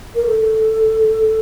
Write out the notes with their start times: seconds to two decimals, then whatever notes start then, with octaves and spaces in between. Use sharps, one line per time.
0.15 A#4
0.26 A4